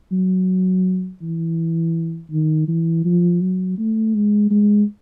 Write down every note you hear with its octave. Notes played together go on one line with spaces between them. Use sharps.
F#3
E3
D#3
E3
F3
F#3
A3
G#3
G#3